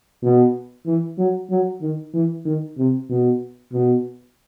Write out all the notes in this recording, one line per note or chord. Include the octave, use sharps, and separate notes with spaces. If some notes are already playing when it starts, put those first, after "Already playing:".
B2
E3
F#3
F#3
D#3
E3
D#3
C3
B2
B2